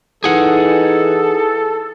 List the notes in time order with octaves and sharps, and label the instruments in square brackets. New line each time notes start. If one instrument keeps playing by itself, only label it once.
[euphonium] E3 [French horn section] D#4 [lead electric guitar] G#4 F#5 [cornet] A4